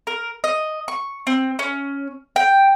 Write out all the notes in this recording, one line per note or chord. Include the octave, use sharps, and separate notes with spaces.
A#4
D#5
C#6
C4
C#4
G5